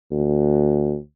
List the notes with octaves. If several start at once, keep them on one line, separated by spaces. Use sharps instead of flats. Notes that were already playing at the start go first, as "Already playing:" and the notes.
D2